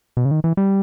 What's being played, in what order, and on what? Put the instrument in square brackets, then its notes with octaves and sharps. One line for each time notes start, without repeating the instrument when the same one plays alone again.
[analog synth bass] B2
C#3
D#3
E3
G3